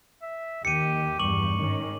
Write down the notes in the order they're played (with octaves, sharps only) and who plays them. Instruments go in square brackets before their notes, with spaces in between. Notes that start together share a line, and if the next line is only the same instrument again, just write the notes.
[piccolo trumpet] E5
[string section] D#2 D#3 [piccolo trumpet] G4 [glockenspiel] C#7 D#7
[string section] E2 G2 [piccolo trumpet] C#6 [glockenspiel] D6 F#7
[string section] G#2 D#3 C#4